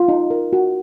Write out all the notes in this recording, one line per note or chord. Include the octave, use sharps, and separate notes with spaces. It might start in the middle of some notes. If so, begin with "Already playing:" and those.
Already playing: F4
D#4
A#4
F#4